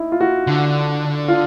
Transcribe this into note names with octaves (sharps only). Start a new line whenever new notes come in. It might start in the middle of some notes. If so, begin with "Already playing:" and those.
Already playing: D#4 E4
F4
F#4
D3
F4